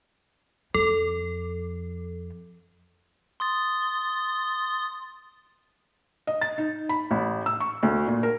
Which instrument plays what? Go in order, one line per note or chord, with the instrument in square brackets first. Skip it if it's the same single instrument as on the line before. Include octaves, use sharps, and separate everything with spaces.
[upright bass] F2 [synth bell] A4
[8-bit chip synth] C6 D#6 A6
[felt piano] D#5
A6
D#4
B5
A1
E6
C#6
D2
A#2
A#4